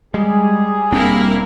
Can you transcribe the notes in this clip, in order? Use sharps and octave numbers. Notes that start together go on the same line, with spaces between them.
G3 G#3 G#4
E1 A#3 C4 D4 E4 A#4